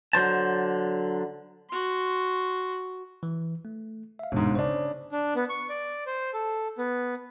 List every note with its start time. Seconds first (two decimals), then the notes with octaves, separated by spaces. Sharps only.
0.13 D3 F#3 C5 A5
1.70 F#4 C6
3.23 E3
3.65 A3
4.19 E5 F5
4.32 G1 G#2 B2 G#3 B3
4.55 C#3 D4 C5
5.12 D4
5.35 B3
5.50 C#6
5.70 D5
6.06 C5
6.33 A4
6.78 B3